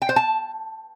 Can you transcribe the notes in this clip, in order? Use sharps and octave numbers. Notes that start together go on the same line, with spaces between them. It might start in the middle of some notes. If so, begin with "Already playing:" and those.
G5
C5
A5